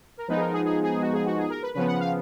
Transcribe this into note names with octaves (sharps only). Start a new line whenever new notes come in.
A#4
F3 G#3 B3 D#4 B4
G#4
A#4
G#4
G#4
G#4
F#4
G#4
F#4
G#4
A#4
B4
C#3 F3 B3 B4
F#5
F5